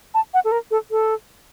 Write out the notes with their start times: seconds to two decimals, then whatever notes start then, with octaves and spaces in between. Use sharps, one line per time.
0.14 A5
0.34 F#5
0.45 A4
0.52 A#4
0.71 A4
0.91 A4